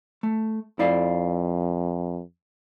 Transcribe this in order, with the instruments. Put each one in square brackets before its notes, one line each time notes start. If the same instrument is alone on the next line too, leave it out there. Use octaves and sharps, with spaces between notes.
[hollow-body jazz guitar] A3
[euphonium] F2 [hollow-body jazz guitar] E4 D5 F5